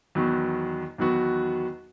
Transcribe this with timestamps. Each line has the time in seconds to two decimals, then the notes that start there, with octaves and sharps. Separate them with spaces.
0.15 E2 D#3 F#3 B3 F#4
0.98 E2 D#3 F#3 B3 F#4